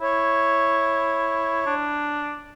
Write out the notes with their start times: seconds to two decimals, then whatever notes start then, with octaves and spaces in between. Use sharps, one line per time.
0.01 E4 C#5
1.66 D4